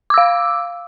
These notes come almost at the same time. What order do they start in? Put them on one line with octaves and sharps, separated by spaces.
D6 E6 F5